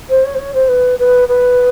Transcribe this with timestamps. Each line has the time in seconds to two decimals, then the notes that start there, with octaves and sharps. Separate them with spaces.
0.09 C5
0.24 C#5
0.34 C5
0.38 C#5
0.53 C5
0.68 B4
0.98 B4
1.28 B4